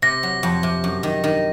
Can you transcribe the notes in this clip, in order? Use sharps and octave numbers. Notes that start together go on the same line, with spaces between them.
C3 A#6
F#3
F2
C3
F#2
D#3
D#3